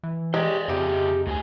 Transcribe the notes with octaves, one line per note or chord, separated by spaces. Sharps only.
E3
G#3 C#4 G4 C5 D5 D#5
F2 C#3 D#4 F4 G4 E5
D2 A2 G#4 G#5